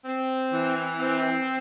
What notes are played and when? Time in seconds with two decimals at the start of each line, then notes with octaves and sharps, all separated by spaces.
0.05 C4
0.52 E3
0.99 C4